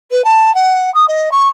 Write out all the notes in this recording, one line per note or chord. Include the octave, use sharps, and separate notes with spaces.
B4
A5
F#5
D#6
D#5
C#6